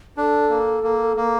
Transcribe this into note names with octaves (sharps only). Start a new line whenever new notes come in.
D4 A4
A#3
A#3
A#3